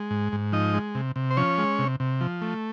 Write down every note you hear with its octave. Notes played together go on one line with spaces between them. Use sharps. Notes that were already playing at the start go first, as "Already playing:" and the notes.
Already playing: G#3
G#2
G#2
F3 D#4 D#5
G#3
C3
C3
C5
F3 C#4 C#5
G#3
C3
C3
F3
A3